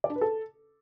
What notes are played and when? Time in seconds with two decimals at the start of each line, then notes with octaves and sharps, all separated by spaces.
0.04 D5
0.10 D4
0.16 B4
0.21 A4